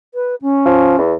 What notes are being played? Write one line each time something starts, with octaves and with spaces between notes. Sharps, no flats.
B4
C#4
F3
E2